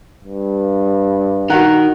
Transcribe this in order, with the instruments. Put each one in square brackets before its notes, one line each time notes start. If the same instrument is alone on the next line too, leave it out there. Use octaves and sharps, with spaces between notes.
[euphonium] G2
[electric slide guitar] D#4 A#4 [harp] F#4 F#5